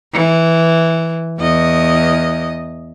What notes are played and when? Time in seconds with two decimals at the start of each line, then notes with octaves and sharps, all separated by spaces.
0.13 E3
1.39 E2 D#5